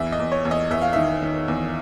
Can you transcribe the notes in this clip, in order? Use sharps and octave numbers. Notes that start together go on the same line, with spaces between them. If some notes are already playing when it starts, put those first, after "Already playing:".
Already playing: E2 E5
D#5
E2
C#5
E2
D#5
E2 E5
F5
D#3 E5
D#3
E2